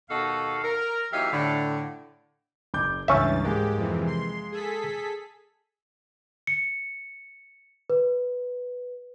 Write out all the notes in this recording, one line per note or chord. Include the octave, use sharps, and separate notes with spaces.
D#2 B2 D#4 F#4 A4 F5
A#4
E2 F#3 D#4 G4 E5 F5
A2 D3
F#1 D6 G6
C#2 G2 E3 C#4 E5 C#6 A6
G#2 G#3 A#3 G4
F2 C3 E3
C6
G#4 A4 B6
C#7
B4